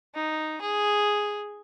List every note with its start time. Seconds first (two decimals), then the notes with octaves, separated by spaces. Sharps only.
0.15 D#4
0.61 G#4